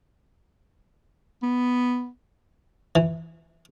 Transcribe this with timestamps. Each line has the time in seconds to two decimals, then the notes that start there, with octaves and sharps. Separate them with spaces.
1.43 B3
2.96 E3